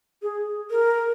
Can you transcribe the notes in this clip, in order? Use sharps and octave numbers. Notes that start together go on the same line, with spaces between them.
G#4
A#4